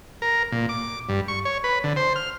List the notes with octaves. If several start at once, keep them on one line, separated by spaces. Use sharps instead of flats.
A#4
A#2
D6
G2
C#6
C#5
B4
D3
C5
F6